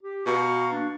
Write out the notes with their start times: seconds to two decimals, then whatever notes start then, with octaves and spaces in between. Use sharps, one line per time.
0.03 G4
0.26 B2 F5 A#5 C#6
0.72 A#3 D4